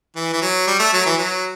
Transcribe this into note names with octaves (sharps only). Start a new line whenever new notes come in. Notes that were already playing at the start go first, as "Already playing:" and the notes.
E3
E3
F#3
G3
A3
F#3
E3
F#3